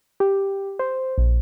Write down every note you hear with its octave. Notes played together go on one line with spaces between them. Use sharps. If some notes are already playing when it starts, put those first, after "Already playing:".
G4
C5
A#1